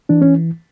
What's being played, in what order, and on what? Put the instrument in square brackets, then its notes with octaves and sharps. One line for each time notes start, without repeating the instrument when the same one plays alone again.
[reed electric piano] E3 D4
C#4